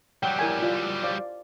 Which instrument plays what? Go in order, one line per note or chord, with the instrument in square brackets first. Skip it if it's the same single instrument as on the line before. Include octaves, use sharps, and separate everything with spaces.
[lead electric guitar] F#3 G3 [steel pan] F#5 G5
[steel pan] E4 A#4 G#5
F4 D5
C5 D5 F5